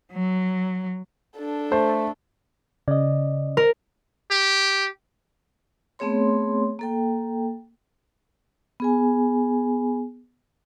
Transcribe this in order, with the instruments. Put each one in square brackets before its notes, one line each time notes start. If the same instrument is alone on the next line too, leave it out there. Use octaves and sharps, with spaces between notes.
[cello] F#3
[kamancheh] D4 A4
[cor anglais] A3 [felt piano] C5
[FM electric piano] C#3 [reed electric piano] D5 D#5
[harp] A#4
[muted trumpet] G4
[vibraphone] A3 B3 C4 G#4 C#5 C6
A#3 A4 G5
B3 G#4 G#5